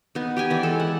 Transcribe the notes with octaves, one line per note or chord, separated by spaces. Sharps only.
B3 D#4
G4 G5 G#5
E3 D5
G#3 A4
F#5